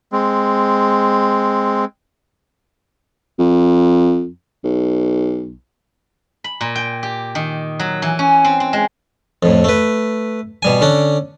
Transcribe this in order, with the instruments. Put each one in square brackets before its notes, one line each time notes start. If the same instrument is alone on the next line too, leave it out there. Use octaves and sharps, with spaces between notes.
[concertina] G#3 C4
[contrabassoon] F2
B1
[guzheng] B5
A#2
G5
G4
D#3
F#3
E3
C#4
C4
C4
G#3
[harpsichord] F2 A2
A3 B4
B2 G3 G#5
D3 C#4 D4